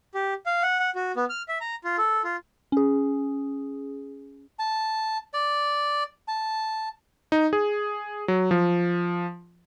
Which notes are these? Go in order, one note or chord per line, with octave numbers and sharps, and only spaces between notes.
G4
F5
F#5
F#5
F#4
B3
F6
E5
A#5
F4
A4
F4
C#4 G#4
A5
D5
A5
D#4
G#4
F#3
F3